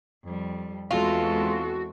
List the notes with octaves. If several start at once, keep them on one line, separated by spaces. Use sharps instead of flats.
F2 G3
E2 E3 G#3 C4 F4 F#4 A4